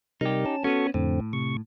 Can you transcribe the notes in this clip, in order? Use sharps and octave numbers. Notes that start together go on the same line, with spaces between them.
C3 G3 D#4 G4 A#4
C#4 A5
B3 C#4 F#4 A4 C#6
F2 A2 D3 C4
C3 C#6